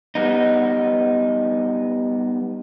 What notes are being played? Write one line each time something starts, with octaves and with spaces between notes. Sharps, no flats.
G3 B3 D#4